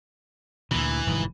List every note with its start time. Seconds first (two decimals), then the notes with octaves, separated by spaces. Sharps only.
0.71 D2 A#2 E3
1.07 F1 G#2 D#3